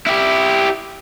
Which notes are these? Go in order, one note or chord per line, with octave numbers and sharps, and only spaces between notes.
E4 G4